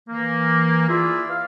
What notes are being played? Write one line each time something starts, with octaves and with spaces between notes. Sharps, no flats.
E3 A#3
E4 F4 G#4 D5 E5
B4 F5